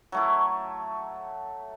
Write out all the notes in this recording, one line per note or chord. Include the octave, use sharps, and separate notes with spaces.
F#3 A3 E4